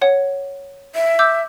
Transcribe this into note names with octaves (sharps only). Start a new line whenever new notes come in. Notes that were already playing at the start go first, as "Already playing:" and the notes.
C#5 F#5
E5
D6 E6 G6